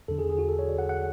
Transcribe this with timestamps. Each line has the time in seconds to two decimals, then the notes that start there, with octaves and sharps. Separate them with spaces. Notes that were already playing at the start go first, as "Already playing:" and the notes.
0.08 E2 D3 A4
0.19 G#4
0.29 G#4
0.39 F#4
0.49 A4
0.59 C#5
0.69 D5
0.79 F#5
0.89 F#5